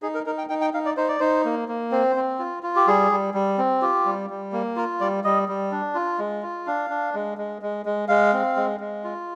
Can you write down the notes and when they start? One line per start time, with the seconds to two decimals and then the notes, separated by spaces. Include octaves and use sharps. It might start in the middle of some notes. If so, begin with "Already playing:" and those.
0.02 D#4 G#4
0.15 A#4
0.26 D#4 A#4
0.38 G5
0.49 D#4 G5
0.61 G5
0.73 D#4 F5
0.86 D5
0.97 D#4 C5
1.08 D5
1.20 D#4 C5
1.45 A#3
1.69 A#3
1.92 C4 C5
2.16 C4
2.39 F4
2.63 F4
2.76 G4
2.87 G3 G#4
3.11 G3
3.34 G3
3.58 C4
3.82 F4 G4
4.05 G3
4.30 G3
4.53 A#3
4.76 F4 A#4
5.01 G3 D5
5.24 G3 D#5
5.49 G3
5.72 D4
5.95 F4
6.19 G#3
6.42 F4
6.67 D4 F5
6.90 D4
7.14 G#3
7.38 G#3
7.62 G#3
7.86 G#3
8.08 G#3 F5
8.33 C4
8.56 G#3
8.80 G#3
9.04 F4